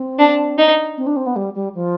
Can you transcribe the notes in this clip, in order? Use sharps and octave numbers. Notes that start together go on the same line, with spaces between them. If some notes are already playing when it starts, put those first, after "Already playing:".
Already playing: C4
D4
D#4
C4
D4
C4
B3
G3
G3
F3